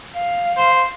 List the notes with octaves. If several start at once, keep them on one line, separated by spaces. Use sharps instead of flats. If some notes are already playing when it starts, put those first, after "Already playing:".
F5
C5